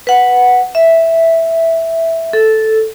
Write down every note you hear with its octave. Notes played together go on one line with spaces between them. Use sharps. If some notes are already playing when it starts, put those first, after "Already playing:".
B4 F#5
E5
A4